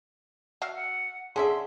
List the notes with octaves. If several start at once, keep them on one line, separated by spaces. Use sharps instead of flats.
F#4 E5 F5
F#5
D3 C#4 G#4 E5 C6